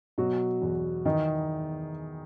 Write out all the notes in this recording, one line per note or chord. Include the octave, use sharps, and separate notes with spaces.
B2 F#3 F#4
E2
D#3 E3 D#4